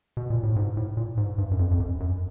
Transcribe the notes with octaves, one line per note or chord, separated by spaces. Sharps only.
B2
A#2
A2
G#2
A2
A#2
G#2
G2
F#2
F2
F2
F#2
F#2